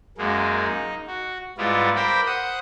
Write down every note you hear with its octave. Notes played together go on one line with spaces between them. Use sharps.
F#2 G#3 A#3
D#4
F#4
G#2 G3 B3 E4 F4
G4 A#4 C5 G5 B5
C5 F#5 D#6